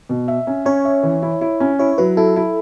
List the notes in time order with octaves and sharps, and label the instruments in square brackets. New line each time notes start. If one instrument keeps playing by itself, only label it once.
[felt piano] B2
E5
C#4
[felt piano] C#4 [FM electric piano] C#5
[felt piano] E5
E3
E4
E4
C#4
[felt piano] E4 [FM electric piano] C#5
[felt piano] F#3 [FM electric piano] B4
[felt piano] E4 [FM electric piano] A4
[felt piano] E4